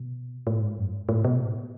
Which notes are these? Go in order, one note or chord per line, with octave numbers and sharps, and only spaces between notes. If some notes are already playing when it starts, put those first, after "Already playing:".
Already playing: B2
A2
G#2
F#2
G#2
A2
B2
A2